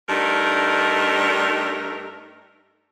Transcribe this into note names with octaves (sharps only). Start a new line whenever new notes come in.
G2 A3 D4 D#4 A#4